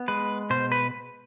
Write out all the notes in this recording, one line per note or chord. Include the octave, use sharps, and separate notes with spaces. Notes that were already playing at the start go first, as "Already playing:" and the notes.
Already playing: B3
G#3 B4
B2 C5
B4